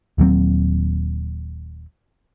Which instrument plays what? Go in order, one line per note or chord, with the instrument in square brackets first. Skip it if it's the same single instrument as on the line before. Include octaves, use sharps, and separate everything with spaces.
[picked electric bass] D#1 D#2 F#3 C4